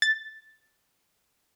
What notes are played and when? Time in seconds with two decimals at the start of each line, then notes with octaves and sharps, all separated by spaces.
0.02 A6